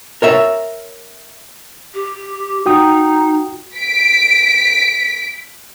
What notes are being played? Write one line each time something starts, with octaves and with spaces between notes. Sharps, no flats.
A#4 C#5 E5
G4
D#4 F#4 G5 D#6
B6 D7